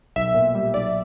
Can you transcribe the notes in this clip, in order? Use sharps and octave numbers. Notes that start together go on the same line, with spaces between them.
B1 E5
A#2
G3
B1 D5